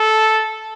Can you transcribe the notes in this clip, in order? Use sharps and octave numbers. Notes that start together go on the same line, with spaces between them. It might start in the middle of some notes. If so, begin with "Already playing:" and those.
Already playing: A4